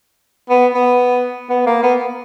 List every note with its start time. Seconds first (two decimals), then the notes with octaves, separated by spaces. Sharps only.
0.49 B3
0.74 B3
1.50 B3
1.66 A#3
1.83 B3